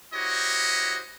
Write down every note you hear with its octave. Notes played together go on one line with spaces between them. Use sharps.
E4 F#4 G4 C5 C#5 D#5